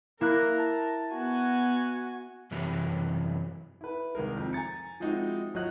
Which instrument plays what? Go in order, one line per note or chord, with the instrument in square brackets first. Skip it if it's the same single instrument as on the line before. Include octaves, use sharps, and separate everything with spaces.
[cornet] A#3 [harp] E4 F#6 [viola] A#4
[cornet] A5
[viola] B3 G#5 [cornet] F#4
[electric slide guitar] F#2 C3 E3 F#3 G3
[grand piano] E4 B4
C2 D#3 G#3 A#4
F2 C4
G#5 A#5 A6 C#7
F3 G#3 C4 D#4 E4 F#4
G#1 F#3 F4 D#5 F#6